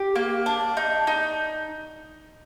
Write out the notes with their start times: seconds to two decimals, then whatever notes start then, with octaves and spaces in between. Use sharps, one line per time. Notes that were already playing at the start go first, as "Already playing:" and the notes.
Already playing: G4
0.16 A#3
0.46 D4
0.77 D#4
1.07 D#4